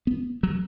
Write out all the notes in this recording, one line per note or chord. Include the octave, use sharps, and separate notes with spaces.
B3
F#3